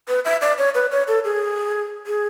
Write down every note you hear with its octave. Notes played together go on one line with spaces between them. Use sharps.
B4
E5
D5
C#5
B4
C#5
A4
G#4
G#4